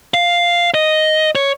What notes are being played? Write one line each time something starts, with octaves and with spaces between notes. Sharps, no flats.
F5
D#5
C#5